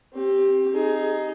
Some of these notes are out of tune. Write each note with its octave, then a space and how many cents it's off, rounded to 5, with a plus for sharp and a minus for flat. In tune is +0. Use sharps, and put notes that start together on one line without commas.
C4 +25 G4 +0
D#4 +0 G#4 +20